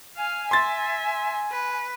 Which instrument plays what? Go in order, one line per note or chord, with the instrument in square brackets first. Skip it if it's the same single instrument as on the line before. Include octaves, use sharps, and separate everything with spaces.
[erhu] F5 [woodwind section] G#5
[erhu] E5 [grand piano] C6 A6
[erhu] B4